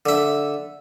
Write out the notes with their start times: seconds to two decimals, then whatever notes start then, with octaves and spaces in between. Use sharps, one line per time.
0.06 D3 E5